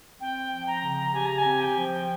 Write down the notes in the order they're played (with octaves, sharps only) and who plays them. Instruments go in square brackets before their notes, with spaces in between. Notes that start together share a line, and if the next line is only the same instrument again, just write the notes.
[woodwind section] C4 [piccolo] G5
[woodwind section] F3
[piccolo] A#5
[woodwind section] C#3
[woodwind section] G4 [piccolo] G#5
[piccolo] A#5
G#5
[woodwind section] C4
[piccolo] G5
[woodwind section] F3